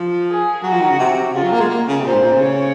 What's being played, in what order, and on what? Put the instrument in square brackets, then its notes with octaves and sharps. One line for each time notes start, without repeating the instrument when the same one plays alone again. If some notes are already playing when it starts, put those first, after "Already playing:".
Already playing: [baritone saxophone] F3
[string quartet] G#4
[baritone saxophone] F#3 [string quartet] F#4
[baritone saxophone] F3
D#3
C#3
C3
[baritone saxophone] C#3 [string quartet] F4
[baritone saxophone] F#3
A#3
G#3
A#3
C#3
C3
[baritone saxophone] A#2 [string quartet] C5
[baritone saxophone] G#2
A#2
C#3
[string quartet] C#5